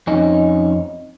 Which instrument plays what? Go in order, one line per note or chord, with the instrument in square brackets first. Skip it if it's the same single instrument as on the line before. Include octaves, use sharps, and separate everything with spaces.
[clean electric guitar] F2 C#4 D#4